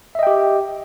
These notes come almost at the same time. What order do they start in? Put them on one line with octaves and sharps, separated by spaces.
E5 D#5 G5 G4